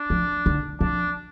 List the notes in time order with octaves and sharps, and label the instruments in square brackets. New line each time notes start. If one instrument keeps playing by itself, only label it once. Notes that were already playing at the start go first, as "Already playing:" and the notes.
Already playing: [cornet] D4
[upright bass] F3
D3
[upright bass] F3 [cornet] D4